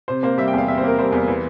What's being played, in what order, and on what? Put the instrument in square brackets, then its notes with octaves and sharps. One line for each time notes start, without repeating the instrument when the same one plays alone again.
[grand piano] C3 C5
A#3 C5
G3 E5
G5
E2
F5
C3 E5
C5
A#3 A#4
G3 C5
E2
E3